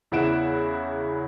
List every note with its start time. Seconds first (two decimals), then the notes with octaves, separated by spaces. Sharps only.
0.12 E2 C#3 E4 F#5 D7 E7